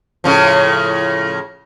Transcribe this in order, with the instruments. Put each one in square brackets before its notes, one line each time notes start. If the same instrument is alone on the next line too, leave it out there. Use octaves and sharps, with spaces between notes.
[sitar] A2 C#3 F3